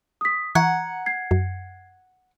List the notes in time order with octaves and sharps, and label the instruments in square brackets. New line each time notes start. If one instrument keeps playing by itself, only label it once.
[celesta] D#6 B6
[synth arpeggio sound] E3 C#6 [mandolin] F#5 [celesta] A#5 G#6
[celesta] G#6 C7
[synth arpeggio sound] F#2